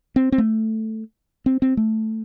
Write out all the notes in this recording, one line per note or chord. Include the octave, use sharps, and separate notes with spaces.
C4
C4
A3
C4
C4
A3